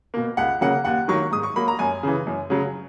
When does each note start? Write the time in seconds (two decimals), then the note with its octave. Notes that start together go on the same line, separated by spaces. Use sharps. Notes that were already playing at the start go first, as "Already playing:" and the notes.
0.14 B2 A#3
0.37 C#2 F#5
0.61 C#3 F#3 A#3 F#5
0.85 D#2 F#5
1.08 D#3 F#3 A#3 C#6
1.31 G#2 D#6
1.43 C#6
1.56 F#3 A#3 B5
1.68 A#5
1.79 F#2 G#5
2.03 C#3 E3
2.27 F#2
2.50 C#3 F#3